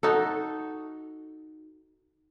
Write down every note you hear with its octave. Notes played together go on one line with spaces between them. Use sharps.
D#4 F#4 A4